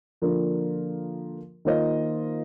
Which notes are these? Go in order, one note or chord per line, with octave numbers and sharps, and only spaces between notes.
D3 F3 A#3 F4 A#4
D#3 A#3 F4 C5 D#5